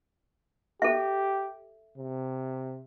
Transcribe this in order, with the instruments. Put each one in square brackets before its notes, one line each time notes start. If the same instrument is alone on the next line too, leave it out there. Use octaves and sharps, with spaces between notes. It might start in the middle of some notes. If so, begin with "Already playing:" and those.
[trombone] G4 [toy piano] A4 E5
[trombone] C3